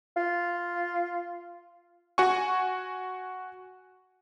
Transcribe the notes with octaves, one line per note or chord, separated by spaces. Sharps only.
F4
F#4 F#5 G#5 C#6